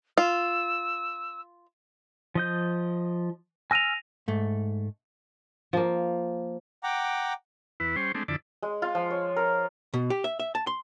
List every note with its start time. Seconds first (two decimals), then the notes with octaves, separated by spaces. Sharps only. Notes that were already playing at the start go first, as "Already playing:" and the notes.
0.18 F4 E6
2.35 F3 D#5 G6
3.71 G#5 E6 F6 A#6 D#7 F7
4.28 G#2 A3
5.73 F3 A#3
6.83 F#5 G5 A#5 D6
7.80 E2 E4 B4
7.96 G3 C#4 C5
8.15 G#3 A3 C4 D4
8.28 F2 D3 E4 D5 A5
8.63 G#3
8.82 F4
8.95 F3
9.10 C#5
9.36 A#4
9.94 B2
10.10 G4
10.24 E5
10.40 E5
10.55 A5
10.67 C6